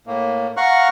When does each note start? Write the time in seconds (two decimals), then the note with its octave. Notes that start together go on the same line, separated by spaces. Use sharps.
0.07 A2 A#3
0.57 F5 F#5 A#5 C#6 F6 F#6